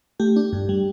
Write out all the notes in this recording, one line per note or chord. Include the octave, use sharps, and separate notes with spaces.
A3 G4
D4
G2
G3